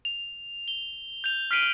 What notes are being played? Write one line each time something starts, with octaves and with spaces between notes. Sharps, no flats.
F7
G7
G6 F7
F6 B6 C7 D7 D#7 F#7